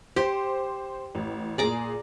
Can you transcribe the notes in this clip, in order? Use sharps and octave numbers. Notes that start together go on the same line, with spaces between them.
G4 C5
A1
A#2 G#4 D5 A#5 D6